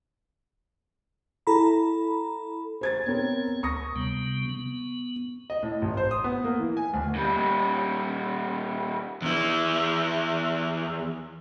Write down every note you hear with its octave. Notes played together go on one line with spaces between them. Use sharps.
E4 A4 A#5 B5
C5 G#6 A6
B3 C4 A#4 C#5
D2 C#6 D#6 A#6
C3 G3 B3
B3
D#5
A2
A1
C5
D#6
B3
A#3
E3
G#5
D2
A#2 G3
E2 E4